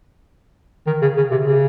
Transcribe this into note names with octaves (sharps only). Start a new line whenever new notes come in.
D#3
C#3
C#3
C3
C#3